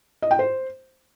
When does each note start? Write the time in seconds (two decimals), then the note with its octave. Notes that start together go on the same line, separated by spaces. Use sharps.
0.22 D#5
0.31 G5
0.39 C5